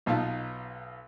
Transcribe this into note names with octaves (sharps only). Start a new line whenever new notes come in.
B1 B2 D#4 F4 A5